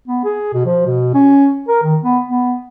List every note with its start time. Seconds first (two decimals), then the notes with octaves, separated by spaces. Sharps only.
0.08 B3
0.24 G#4
0.53 B2
0.66 F3
0.86 B2
1.14 C#4
1.68 A#4
1.83 D#3
2.03 B3
2.28 B3